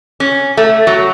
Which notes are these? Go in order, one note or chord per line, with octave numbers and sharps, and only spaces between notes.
C#4
A3
F#3